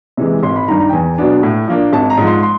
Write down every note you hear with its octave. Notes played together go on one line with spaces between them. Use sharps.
C3 E3 G#3
G#1 C6
B5
G2 D#3 A#5
A#5
G5
E2 G#5
B2 F#3 B3 D4
A2
F3 A#3 D4
G#1 A5
A#5
G#2 F3
C6
C6